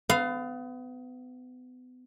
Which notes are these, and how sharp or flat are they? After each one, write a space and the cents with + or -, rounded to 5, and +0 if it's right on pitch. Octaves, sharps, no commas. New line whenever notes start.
B3 +35 F5 +0